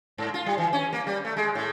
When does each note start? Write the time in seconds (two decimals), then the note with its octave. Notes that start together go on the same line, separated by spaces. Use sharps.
0.18 G#2
0.34 F4
0.46 G3
0.58 E3
0.73 C#4
0.93 A#3
1.07 G3
1.25 A3
1.37 G#3
1.55 A2